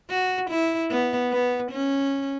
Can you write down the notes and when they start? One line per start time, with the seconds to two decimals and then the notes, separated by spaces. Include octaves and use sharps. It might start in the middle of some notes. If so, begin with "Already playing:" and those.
0.10 F#4
0.50 E4
0.91 B3
1.32 B3
1.72 C#4